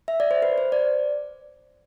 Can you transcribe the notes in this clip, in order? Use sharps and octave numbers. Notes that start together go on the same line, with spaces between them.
E5
D5
C5
B4
C5
D5